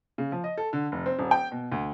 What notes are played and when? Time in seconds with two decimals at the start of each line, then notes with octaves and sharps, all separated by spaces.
0.18 C#3
0.32 F3
0.44 D#5
0.58 A4
0.73 D3
0.92 F1
1.06 C4
1.19 D#1
1.31 G5
1.52 B2
1.72 D2